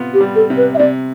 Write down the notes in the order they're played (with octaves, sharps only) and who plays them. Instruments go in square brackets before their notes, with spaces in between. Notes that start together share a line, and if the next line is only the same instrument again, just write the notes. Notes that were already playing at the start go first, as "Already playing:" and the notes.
Already playing: [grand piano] C3 B3 F4
[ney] G4
[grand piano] G3
[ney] A4
[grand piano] C3
[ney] B4
E5
[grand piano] C3 [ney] D5